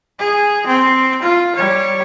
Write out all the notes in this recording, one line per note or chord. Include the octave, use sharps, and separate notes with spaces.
G#4
C4
F4
G3 C#5